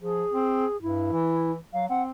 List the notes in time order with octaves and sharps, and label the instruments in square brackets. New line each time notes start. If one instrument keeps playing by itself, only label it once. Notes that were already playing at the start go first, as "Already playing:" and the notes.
[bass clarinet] F3 [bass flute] G#4
[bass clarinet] C4
[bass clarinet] G2 [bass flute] E4
[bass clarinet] E3
[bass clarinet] F#3 [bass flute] F5
[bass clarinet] C4 [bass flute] F#5